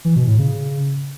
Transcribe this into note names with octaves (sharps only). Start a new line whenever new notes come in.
E3
B2
A2
C#3